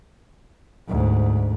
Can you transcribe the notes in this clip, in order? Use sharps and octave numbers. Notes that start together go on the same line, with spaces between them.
D2 G#2